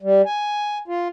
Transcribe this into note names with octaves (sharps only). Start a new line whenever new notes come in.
G3
G#5
F4